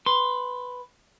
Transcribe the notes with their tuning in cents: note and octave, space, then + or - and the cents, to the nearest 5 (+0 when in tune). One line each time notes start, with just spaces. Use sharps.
B4 +5 C6 +0